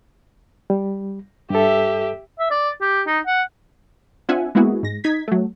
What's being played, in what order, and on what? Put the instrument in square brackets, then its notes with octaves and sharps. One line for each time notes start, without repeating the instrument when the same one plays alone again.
[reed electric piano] G3
[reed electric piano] G2 A4 [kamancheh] G4 E5
[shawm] E5
D5
G4
D#4
F#5
[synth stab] C4 D4 F4 E5 F#5 G#5
G#3 A#3 B3 E4 F#4 G#4
G#2 A#6
D#4 G#6 B6
F#3 A3